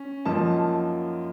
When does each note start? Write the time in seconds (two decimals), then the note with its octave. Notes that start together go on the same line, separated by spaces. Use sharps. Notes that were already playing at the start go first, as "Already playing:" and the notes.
Already playing: C#4
0.25 F#2 F3 A#3 D#4 A5